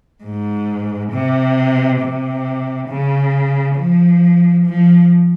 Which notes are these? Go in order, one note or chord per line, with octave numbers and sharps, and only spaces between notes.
G#2
C3
C3
C#3
F3
F3